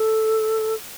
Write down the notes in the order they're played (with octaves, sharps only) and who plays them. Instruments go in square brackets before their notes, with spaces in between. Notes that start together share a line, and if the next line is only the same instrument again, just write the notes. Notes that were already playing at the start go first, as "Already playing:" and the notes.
Already playing: [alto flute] A4